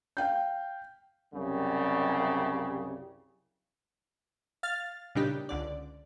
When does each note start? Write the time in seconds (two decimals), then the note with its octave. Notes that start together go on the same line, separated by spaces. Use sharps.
0.17 F5 G5 G6
1.33 C2 F#2 C#3 G3 G4
4.63 F5 F6 A6
5.15 A#2 C#3 G3 D4 D#4 G4
5.49 C#2 D3 D5